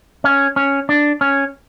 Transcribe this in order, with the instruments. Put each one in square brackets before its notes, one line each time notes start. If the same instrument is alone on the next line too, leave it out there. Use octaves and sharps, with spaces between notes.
[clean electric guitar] C#4
C#4
D4
C#4